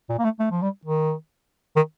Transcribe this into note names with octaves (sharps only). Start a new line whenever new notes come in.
A#2
A#3
A3
A3
F3
G3
D#3
D#3